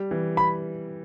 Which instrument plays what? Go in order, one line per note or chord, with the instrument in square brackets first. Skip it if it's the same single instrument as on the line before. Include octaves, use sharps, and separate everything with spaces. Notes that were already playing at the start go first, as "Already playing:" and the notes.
Already playing: [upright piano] G3
E3
[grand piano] B5